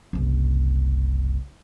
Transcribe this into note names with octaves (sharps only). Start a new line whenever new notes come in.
F#1 C2